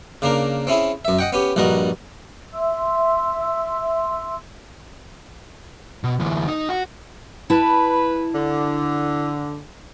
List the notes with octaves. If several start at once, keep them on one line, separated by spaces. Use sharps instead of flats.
C#3 A#3 D4 A#4
C4 C#4 E4 G#4
F#2 E5
D#5 F#5 G5
B3 C#4 G4
A#1 G2 G3 F#4 A#4 D#5
E5 C6 E6
B2
D2 E3
D#4
F#4
E4 B4 A5
D3